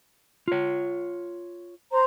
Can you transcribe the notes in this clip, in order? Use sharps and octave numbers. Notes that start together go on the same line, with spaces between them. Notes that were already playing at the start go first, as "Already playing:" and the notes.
F4 C#5
C5 A#5